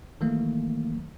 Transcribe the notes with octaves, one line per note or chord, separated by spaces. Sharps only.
D#3 E3 F#3 A3 A#3